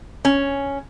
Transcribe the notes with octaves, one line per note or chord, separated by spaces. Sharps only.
C#4